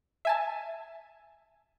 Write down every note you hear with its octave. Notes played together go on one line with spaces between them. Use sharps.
E5 G#5 A5